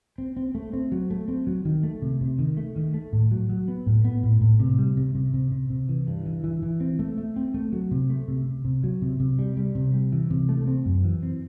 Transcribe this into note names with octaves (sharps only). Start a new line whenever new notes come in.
C4
C4
A3
C4
F#3
A3
C4
F#3
D#3
A3
C3
C3
D#3
A3
D#3
A3
A2
F#3
F#3
B3
A2
B3
A2
A2
C3
G3
C3
C3
C3
C3
C3
E3
G2
E3
E3
E3
C4
A3
A3
C4
A3
F#3
C3
A3
C3
C3
C3
F#3
C3
C3
G3
G3
C3
G3
E3
C3
A3
C4
F#2
E3
C4